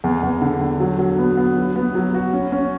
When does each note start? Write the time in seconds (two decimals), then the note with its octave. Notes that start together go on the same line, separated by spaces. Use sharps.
0.04 E2
0.23 E2
0.42 D3
0.61 D3
0.80 F#3
0.99 F#3
1.18 B3
1.37 B3
1.57 F#3
1.76 B3
1.95 F#3
2.14 F#4
2.33 C#4
2.52 C#4